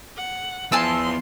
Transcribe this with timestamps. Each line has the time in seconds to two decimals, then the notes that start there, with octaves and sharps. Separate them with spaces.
0.17 F#5
0.72 F3 B3 E4 G#5 A5 C6 E6